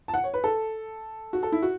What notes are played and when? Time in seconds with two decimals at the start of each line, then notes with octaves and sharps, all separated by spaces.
0.08 A5
0.14 F#5
0.24 C#5
0.34 B4
0.44 A4
1.33 F#4
1.43 A4
1.52 E4
1.62 F#4